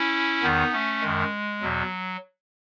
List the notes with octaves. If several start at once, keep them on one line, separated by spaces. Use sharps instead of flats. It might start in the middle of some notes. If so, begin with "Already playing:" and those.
Already playing: C#4 E4
E2 D#3 B3 D#4
A3 C#4
F#2 D#3 G#3
E2 B2 F#3